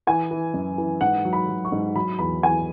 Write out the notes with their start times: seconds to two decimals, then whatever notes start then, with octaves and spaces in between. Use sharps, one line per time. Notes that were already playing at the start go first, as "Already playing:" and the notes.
0.07 E3 G#5
0.31 E3
0.54 F#2
0.78 E3
1.01 G#2 F#5
1.25 F#3
1.33 B5
1.49 F#3
1.65 C#6
1.72 G#2
1.96 F#3 B5
2.19 E2 B5
2.42 E2 G#5